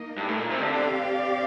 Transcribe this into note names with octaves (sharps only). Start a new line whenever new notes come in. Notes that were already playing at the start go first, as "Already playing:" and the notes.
Already playing: A#3 D#4 A#4 D#5
G2
A2
A#2
C3
D3 C4 G4 D5 F5